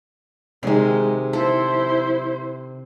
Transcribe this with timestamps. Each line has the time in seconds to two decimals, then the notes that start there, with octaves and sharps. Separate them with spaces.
0.63 C3 D#3 G#3
1.33 E4 A4 C5